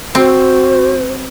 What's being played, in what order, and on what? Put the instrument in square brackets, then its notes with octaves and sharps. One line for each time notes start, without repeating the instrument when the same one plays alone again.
[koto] C4 [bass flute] F#4 [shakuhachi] C5